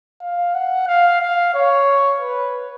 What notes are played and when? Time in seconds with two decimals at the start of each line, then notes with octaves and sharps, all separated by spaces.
0.21 F5
0.54 F#5
0.87 F5
1.21 F5
1.54 C#5
2.20 B4